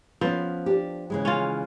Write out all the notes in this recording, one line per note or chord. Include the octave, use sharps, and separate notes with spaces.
F3 B3 C#4 B4
D4 G4
C#3 E3 G#3
C#4 F4